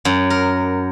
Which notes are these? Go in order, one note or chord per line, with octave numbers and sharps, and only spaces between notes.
F#2
A#4